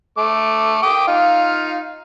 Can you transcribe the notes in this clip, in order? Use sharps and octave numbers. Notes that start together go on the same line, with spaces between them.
A3 D6
G5 D6 D#6
D#4 F4 F5